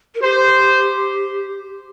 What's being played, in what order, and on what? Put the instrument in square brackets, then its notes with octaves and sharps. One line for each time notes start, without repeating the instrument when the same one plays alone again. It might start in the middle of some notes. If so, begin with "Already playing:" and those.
[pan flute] A#4
[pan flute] G4 [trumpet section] C5